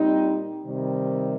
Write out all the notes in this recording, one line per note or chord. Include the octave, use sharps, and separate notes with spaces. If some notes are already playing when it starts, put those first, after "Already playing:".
Already playing: A#2 G3 C4 D#4
C3 D#3 G3